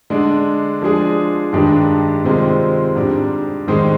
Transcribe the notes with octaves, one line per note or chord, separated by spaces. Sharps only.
D3 G#3 D4
F3 G#3 D4 G#4
G2 D#3 G#3 D4 G4
C3 D#3 G#3 C4 F4
G#2 G3 D4
G#2 D#3 G#3 C4